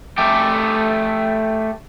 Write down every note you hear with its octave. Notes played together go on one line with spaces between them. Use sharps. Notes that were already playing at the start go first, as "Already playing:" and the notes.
A3 G4